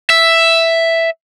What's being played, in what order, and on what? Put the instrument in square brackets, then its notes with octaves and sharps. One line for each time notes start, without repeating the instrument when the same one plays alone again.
[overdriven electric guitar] E5